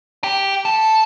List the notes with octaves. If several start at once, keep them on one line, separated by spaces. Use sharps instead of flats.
G4
A4